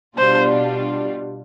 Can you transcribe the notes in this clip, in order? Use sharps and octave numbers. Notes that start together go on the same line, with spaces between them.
B2 G3 D4 F4 C5